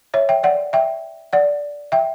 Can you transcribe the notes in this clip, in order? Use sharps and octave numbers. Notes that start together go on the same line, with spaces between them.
C#5 E5
E5 G5
D5 F#5
E5 G5
D5 F#5
E5 G5